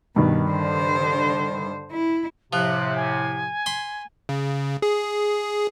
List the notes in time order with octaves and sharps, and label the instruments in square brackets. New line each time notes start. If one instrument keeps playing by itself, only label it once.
[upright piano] G2 D#3 [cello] B2
[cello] D3 C5
E4
[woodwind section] A2 C3 [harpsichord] F3 [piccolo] F#6
[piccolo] G#5
[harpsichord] B5 C6
[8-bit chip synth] C#3
G#4